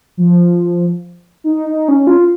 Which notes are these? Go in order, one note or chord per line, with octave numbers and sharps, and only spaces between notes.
F3
D#4
D#4
C#4
F4